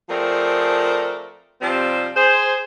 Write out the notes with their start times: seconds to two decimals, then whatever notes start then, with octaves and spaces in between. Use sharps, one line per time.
0.09 F3 A3 C4 G#4 A#4 D5
1.61 C3 F3 G3 C4
2.15 G#4 C5